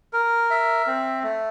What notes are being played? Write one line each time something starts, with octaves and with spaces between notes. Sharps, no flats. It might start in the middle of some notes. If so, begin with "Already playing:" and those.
A#4
E5
C4
A3